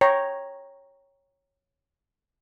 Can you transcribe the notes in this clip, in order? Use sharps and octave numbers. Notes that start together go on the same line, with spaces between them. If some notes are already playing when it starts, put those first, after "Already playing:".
C#5 G5 A#5